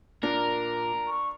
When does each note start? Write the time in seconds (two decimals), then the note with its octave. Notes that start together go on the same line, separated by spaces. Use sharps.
0.23 A#2 D4 A#4
1.08 C#6